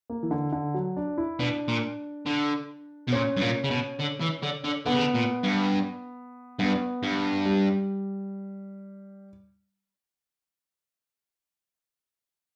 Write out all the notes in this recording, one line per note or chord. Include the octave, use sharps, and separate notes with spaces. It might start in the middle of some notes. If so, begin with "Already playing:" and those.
A#3
E3
D3
D3
F#3
D4
E4
B2 D4
A#2
D3
B2
A#2 C#4
G2
A#2
C#3
B2
D3
E3
D3
D3
D3 B3
C#3
D3
A#2
G2
G2 B3
G2
G3